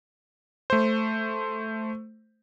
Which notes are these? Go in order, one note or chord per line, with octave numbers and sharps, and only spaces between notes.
A3 C5